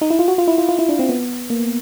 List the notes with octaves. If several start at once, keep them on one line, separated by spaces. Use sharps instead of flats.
D#4
E4
F4
F#4
F4
E4
F4
F4
E4
D4
C4
B3
A#3